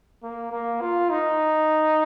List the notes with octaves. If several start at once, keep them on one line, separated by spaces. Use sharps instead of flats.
A#3
A#3
F4
D#4